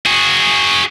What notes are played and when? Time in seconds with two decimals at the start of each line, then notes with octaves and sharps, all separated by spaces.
0.06 F#4 G#4